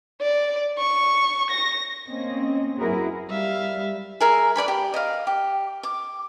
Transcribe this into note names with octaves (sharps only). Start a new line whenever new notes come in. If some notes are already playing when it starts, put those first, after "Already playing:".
D5
C#6
A#6
A#3 C4 C#4 D#5
F#2 E4 F#4 G#4 A#4 B4
G3 E5 F5
G#4 A#4 E5
B4 D5 G#5 B5
G4
D#5 F5
G4
D6